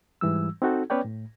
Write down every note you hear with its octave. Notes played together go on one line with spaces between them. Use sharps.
G#2 E3 G3 E6
C4 D#4 F#4 A4
B3 C#4 B4 C#5 D5 G5
A2